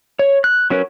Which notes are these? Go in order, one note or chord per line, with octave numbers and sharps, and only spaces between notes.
C#5
F#6
F#3 C#4 A#4 B4